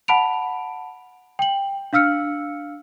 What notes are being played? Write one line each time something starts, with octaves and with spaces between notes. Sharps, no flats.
F#5 A5 B5 D7 F7
G5 F#7
D4 F5 E6 F6 C#7